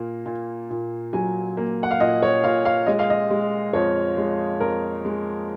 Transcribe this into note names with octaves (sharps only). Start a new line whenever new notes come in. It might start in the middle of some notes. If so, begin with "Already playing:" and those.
Already playing: A#2 A#3
A#2
A#2
F#3 G#5
A#3
F#5
F5
A#2 D#5
C#5
A#2 F5
F5
G#3 D#5
F5
D#5
G#3
F2 C#5
G#3
F2 A#4
G#3